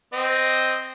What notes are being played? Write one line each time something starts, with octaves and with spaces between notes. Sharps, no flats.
C4 D#5